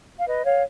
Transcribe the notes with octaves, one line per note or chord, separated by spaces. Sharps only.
F5
B4 D#5
C#5 F5